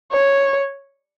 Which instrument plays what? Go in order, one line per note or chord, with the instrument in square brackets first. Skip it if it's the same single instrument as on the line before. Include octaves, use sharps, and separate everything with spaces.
[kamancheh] C#5